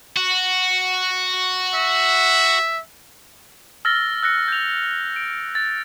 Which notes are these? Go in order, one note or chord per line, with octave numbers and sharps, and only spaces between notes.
F#4
E5
E6 F6 A6 A#6 G7
E6 F#6 A#6 C#7
G6 F7
D7
A6